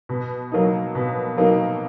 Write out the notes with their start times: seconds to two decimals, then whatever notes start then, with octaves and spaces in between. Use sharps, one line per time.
0.09 B2
0.52 F#3 A#3 D#4
0.95 B2
1.37 F#3 A#3 D#4